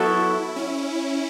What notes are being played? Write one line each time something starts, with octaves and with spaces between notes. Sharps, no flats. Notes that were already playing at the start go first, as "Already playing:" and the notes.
Already playing: F#3 B3 E4 F#4 A4
C#4